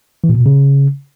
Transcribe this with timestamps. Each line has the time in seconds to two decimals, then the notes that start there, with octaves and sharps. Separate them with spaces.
0.24 E3
0.29 A#2
0.35 B2
0.40 A#2
0.46 C#3